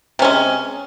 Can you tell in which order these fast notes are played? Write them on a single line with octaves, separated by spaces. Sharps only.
C3 C#4 G#3